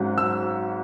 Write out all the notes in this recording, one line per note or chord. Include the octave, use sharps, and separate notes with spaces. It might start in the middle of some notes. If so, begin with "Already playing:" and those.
Already playing: G#1 G#2 F#3 C#4
E6